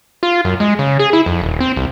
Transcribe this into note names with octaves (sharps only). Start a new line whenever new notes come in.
F4
F#2
G#3
C#3
G#4
E4
F2
D#1
C4
C2